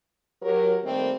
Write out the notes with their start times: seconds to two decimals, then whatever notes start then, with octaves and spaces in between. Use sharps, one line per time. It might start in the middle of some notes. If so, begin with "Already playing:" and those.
0.42 F#3 G4 A#4
0.83 D#3 G3 A3 A#3 C4